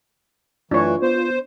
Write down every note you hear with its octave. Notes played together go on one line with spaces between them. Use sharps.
F#2 E3 A3 D4 F4 B4 C#5
B3 C5